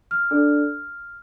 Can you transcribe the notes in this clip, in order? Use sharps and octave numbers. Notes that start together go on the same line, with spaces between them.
F6
D4 A4 D5